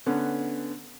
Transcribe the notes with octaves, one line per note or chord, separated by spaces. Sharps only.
D3 B3 C#4